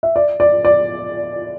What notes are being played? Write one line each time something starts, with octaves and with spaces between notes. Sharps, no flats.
E5
D5
D5
D5